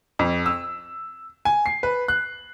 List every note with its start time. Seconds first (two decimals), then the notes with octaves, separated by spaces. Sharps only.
0.19 F2
0.46 E6
1.45 G#5
1.66 C7
1.83 B4
2.08 F#6